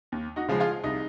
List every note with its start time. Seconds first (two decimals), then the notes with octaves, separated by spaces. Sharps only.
0.12 D#2
0.36 D#4 F#4
0.48 C#3 F3 G#3
0.60 F4 G#4
0.84 C2 D#4